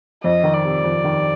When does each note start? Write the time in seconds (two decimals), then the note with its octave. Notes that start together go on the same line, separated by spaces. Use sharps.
0.24 F2 D#5
0.44 D#3
0.54 D5
0.64 C3
0.84 F2
1.04 D#3